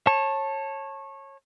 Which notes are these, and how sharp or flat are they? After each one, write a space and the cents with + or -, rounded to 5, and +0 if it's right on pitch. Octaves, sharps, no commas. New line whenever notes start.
C#5 -25 A5 +0